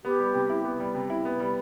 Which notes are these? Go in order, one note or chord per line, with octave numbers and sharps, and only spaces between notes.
B3 G4
G3
C3
E4
B3
G3
C3
E4
B3
G3